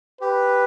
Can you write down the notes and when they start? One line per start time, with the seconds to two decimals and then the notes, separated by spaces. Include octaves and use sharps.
0.21 G4 B4